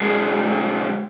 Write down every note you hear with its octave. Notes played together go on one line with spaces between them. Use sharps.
B1 G#3